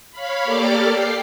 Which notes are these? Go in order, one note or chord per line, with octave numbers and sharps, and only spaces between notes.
C#5 F5 B5
A#3 G4 A4 D5 D6 F6
G5 C7